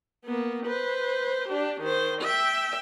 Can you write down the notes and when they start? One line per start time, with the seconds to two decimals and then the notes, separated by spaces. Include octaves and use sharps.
0.25 A#3 B3
0.66 B4 C5
1.49 D4 G4
1.81 D#3 C5
2.22 E5 G5